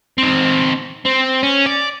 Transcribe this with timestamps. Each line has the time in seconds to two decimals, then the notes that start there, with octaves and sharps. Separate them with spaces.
0.18 C4 D#4
1.05 C4
1.43 C#4
1.66 D5